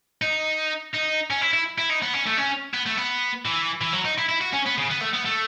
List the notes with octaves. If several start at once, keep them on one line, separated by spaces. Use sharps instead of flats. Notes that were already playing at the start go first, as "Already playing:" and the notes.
D#4
D#4
C#4
E4
E4
E4
D#4
B3
C#4
A3
C#4
B3
A3
B3
E3
E3
F#3
D#4
E4
E4
F#4
C#4
B3
C#3
B3
A3
B3
A3